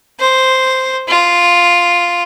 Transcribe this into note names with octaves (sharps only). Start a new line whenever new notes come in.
C5
F4